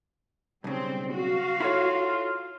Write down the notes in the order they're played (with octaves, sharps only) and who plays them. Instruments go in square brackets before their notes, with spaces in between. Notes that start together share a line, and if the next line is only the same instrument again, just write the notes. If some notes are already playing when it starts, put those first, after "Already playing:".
[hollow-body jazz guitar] B1 C#3 [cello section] G3 C4
[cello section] F#4 F5
[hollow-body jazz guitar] E4 A4 C#5 [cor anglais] F4